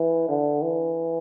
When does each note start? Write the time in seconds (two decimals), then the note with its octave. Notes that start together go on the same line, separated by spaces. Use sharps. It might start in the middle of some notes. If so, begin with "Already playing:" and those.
Already playing: E3
0.29 D3
0.62 E3